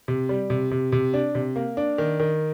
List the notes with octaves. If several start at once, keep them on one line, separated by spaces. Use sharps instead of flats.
C3
G3
C3
C3
C3
D4
C3
A#3
D4
D#3
D#3